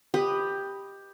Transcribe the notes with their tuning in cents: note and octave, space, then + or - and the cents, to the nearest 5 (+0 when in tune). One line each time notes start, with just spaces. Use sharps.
G4 +10 B4 +0 D#5 +0